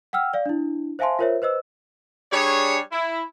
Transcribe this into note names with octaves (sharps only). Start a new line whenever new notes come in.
F#5 G5 E6 F6
D5 F5
D4 E4
C5 E5 F5 G#5 A5 C6
F4 A#4 C5 C#5 E5
B4 C5 D#5 E6
G3 D4 G#4 C#5
E4